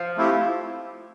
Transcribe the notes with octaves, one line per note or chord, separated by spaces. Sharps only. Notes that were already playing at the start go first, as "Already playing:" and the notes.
Already playing: F3
A3 C4 E4 G4